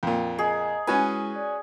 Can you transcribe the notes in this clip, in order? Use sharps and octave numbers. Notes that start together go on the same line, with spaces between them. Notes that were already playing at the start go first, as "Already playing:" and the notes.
F2 A#2 G5
G#4 D#5 A#5
G#3 C#4 E4 F#4 B4 G#5
D5